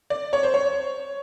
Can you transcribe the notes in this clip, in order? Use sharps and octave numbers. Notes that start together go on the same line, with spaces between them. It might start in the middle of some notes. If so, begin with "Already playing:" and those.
D5
C#5
C5
C#5